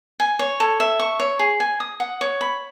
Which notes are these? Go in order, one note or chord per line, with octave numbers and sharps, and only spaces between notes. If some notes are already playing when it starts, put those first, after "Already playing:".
G#5
C#5
A4
E5
C#6
C#5
G#4
G#5
D#6
F#5
C#5
B5